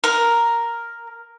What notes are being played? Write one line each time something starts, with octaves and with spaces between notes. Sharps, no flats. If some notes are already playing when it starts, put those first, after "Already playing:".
A#4